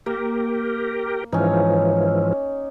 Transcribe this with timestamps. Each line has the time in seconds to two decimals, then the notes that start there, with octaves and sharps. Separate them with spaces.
0.06 A#3 G4 A#4
1.33 G#2 E3 F3 C#4 D#4